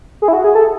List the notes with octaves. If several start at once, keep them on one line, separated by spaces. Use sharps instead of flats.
G#4
E4
F#4
G#4
A4